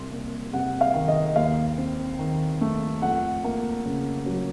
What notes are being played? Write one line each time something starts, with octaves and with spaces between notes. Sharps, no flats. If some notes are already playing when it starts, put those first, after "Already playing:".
Already playing: C2 C6
A#3
C3 F#5
F5
D#3
D#5
D#5
D#2 F5
C4
D#3
A3
F2 F#5
A#3
C#3
F#3